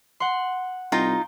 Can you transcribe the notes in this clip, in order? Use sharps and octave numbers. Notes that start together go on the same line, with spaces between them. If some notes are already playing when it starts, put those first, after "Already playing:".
F#5 C6
C2 D#4 F4 G5 A#5